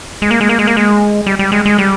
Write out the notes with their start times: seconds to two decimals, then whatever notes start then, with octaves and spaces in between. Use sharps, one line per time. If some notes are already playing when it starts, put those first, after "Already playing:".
0.22 G#3
0.31 A#3
0.41 G#3
0.49 A#3
0.59 G#3
0.67 A#3
0.77 G#3
1.26 G3
1.39 G3
1.52 G#3
1.66 G#3
1.78 G3